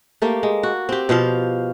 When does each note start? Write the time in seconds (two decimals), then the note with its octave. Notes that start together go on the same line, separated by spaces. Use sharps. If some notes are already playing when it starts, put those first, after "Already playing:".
0.22 A3 A#3 G4
0.43 G#3
0.63 F#4
0.89 C4 G4
1.09 B2 F3 C5 F5